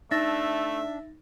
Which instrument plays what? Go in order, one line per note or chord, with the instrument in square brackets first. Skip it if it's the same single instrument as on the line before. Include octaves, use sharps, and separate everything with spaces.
[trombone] A3 [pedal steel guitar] D4 [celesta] D#4 A6 A#6 [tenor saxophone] E5